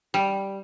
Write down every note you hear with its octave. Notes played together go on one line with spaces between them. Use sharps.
G3